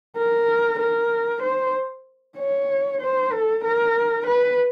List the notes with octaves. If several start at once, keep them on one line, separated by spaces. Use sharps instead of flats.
A#4
A#4
C5
C#5
C5
A4
A#4
B4